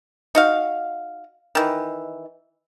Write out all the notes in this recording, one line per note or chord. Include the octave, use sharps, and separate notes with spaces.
D#4 F#4 F5
D#3 E3